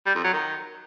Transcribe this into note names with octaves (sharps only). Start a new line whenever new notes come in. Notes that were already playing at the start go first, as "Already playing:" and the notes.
G3
F2
F#3
D#3